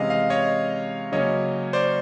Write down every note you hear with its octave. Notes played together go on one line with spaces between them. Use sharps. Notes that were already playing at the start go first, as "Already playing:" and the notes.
Already playing: C3 E3 G#3 C#4 D#5 F5
D#5 F5
C#5 D#5
C#3 F#3 A#3 C#4 C#5 D#5
C5 D5